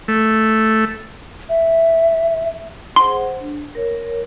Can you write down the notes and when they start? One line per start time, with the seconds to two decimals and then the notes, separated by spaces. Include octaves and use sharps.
0.08 A3
1.49 E5
2.96 G#4 C5 F#5 C6
3.40 D4
3.75 A#4 C#5